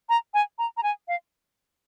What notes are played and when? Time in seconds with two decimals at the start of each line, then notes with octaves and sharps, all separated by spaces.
0.09 A#5
0.34 G#5
0.58 A#5
0.77 A#5
0.83 G#5
1.08 F5